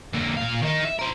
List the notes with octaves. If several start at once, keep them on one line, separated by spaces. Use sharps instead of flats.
D3 A#3
A#2 F5
D#3 D#4
E5
A#4 C5